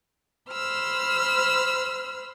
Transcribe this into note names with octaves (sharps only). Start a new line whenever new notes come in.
C5 B5 E6 F6